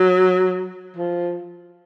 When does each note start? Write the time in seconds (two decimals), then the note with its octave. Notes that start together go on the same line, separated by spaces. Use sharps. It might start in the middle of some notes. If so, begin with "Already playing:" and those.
Already playing: F#3
0.96 F3